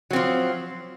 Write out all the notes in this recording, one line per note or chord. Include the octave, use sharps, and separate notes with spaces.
F3 F#3 C4